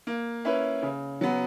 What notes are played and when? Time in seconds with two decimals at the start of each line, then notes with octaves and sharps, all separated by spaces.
0.07 A#3
0.45 C#4 E4 B4
0.82 C#3
1.21 F#3 B3